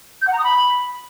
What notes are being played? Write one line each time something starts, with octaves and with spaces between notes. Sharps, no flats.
G6
F#5
A#5
D#6
B5